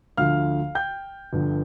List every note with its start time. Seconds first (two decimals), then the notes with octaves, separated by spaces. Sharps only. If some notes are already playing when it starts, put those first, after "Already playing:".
0.17 D2 D3 F3 F5 F6
0.75 G5 G6
1.33 G1 G2 D3 F3